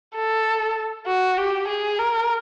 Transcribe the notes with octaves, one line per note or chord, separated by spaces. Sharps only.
A4
F#4
G4
G#4
A#4